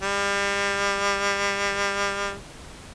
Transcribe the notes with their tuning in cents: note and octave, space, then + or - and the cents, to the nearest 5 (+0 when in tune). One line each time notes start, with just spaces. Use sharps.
G3 +35